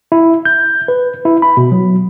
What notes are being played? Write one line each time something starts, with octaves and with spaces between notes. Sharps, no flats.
E4
G6
B4
E4
B5
B2
F#3